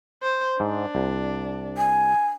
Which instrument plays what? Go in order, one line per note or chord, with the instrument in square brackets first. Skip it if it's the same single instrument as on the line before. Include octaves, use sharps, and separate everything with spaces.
[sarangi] C5
[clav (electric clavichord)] G#2 [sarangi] D4
[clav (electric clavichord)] C2
[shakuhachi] G#5